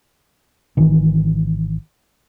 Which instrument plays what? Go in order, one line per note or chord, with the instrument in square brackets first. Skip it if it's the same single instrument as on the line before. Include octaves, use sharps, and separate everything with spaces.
[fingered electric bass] G#1 D#3 E3